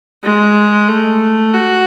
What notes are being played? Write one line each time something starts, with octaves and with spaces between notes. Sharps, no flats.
G#3
A3
F#4